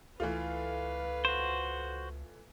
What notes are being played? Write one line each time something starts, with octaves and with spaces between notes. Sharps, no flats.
C#2 E3 A3 F4 B4 F5
F#4 C5